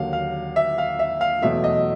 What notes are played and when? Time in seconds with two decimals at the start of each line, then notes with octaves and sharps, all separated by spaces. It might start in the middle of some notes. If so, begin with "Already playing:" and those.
Already playing: D#2 D3 F#3 A#3 F5
0.13 F5
0.56 E5
0.78 F5
0.99 E5
1.21 F5
1.42 E2 B2 F#3 A3 E5
1.64 D#5